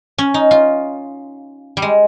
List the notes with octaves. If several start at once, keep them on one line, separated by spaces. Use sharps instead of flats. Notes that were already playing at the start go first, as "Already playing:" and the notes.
C#4
D#4
F4
G3
G#3